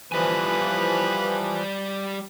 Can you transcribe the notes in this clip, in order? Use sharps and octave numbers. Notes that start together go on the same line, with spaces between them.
E3 F3 G3 B4 G#5